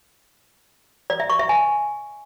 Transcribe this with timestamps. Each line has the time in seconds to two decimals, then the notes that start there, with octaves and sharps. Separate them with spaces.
1.10 D5
1.20 E5
1.30 C#6
1.39 E5
1.49 G#5